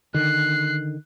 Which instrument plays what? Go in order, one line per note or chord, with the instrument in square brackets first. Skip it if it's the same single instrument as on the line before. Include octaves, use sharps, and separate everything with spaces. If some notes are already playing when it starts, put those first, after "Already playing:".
[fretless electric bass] D3 D#3 [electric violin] F#6 C7